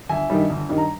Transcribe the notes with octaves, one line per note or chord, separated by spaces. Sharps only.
G1 E5 G#5
G2 D#3 G3
G1
G2 D#3 G3
A#5